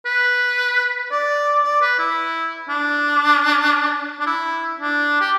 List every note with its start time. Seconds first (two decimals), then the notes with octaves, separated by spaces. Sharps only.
0.06 B4
1.11 D5
1.64 D5
1.82 B4
1.99 E4
2.69 D4
4.20 D4
4.27 E4
4.80 D4
5.21 G4